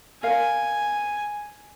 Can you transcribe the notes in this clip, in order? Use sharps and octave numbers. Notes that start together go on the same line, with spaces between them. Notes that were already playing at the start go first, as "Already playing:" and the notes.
A#4 F5 G#5